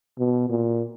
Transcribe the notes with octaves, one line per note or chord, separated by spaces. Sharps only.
B2
A#2